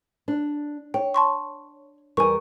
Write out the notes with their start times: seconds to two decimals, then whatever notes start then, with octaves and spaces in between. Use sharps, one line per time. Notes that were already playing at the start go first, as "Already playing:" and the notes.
0.28 D4
0.94 C#5 G5
1.14 A5 C6 C#6
2.17 E2 G3 A#4 G#5 C#6